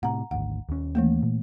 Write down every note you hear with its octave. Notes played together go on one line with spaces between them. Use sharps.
A2 C3 F#5 A#5
G#1 D2 F#5
D#2 C#4
E3 A3 A#3
A#2